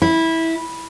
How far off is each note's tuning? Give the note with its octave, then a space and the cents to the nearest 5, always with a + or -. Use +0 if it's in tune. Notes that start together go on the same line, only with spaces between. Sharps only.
E4 -15